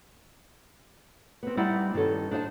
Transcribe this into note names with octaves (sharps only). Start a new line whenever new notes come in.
B3 C4
G3 C4 D#4 E4 D5 F#5
G2 D#3 C#4 A4
D4 D#4 C5 F5 A5